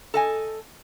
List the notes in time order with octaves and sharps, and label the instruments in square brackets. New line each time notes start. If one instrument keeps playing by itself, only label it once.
[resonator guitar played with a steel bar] A4 D#5 G#5